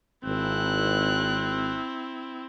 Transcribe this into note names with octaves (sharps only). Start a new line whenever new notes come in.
G#1 C4 E4 F#6